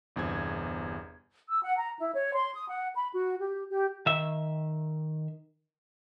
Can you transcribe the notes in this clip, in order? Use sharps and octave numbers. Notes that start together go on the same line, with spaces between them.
G1 E2 C3 G#6
E6
F#5
A#5
E4
C#5
C6
D#6
F#5
B5
F#4
G4
G4
D#3 E5